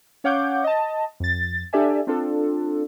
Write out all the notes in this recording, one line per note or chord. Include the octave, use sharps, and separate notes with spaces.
C#4 C#5 F5 F#5 D6 G6
D#5 A5
F2 A6
D4 G4 A4 D5 E5 G#5
C4 D4 F4 A4